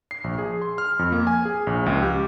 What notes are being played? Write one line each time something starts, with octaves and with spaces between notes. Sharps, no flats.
C7
A#1
G#4
C6
F6
F2
A#3
G#5
G#4
A#1
C#2
G4